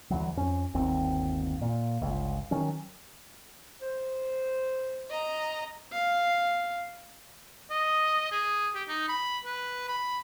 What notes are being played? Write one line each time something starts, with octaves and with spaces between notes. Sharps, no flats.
D2 E3 F#3
F2 C#4
G1 D#2 C4
A#2
G1 C#2
D#3 F#3 C#4
C5
D#5 A#5
F5
D#5
G#4
G4
D#4
B5
B4
B5